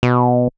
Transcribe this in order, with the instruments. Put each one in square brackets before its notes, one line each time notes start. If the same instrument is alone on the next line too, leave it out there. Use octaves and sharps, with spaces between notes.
[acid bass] B2